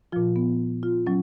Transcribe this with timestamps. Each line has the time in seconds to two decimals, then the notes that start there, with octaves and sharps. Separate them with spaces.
0.12 A#2 F3 F4
0.36 B3
0.83 F4
1.07 F#3 C#4